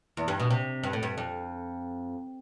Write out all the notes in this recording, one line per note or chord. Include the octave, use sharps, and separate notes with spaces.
E2
G2
B2
C3
G2
A2
G2
F2